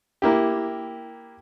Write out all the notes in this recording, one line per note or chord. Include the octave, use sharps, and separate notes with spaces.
A#3 E4 G4